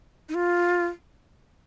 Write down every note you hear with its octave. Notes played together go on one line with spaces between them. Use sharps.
D#4
F4